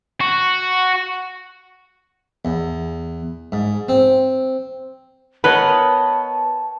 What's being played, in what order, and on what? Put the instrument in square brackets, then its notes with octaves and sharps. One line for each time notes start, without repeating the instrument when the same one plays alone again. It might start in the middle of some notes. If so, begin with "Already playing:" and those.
[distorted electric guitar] F#4
[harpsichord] E2
G#2
C4
[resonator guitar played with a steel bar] B3 [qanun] A#4 C#5 D#5 [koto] B4 [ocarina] A5